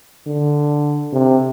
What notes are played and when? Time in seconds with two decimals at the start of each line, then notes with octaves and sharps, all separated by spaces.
0.27 D3
1.13 C3